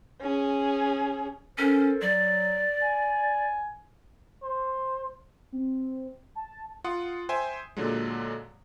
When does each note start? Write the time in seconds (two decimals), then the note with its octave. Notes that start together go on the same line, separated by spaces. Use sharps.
0.21 C#4 G#4
1.58 C#4 A4 A#4 C5
2.02 F#3 D5
2.81 G#5
4.43 C5
5.52 C4
6.35 A5
6.84 F4 F#5 C6 D#6
7.29 C5 E5 G5 G#5
7.77 A#2 D3 F#3 G#3